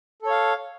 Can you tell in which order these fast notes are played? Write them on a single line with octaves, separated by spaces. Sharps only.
A4 C#5 F5